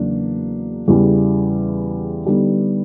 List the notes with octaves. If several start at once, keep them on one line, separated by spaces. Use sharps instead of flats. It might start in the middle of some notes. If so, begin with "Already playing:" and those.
Already playing: E2 C#3 F#3 A#3 D4
E2 C#3 E3 G3
D3 G3 B3 D#4